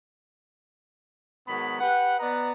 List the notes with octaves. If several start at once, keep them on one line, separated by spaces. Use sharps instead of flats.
G#2 D#3 F#3 B3 B5
G4 B4 F#5
B3 B4 D5 D#5 A#5